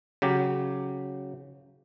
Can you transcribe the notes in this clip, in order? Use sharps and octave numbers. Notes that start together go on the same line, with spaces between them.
C#3 F#3 G4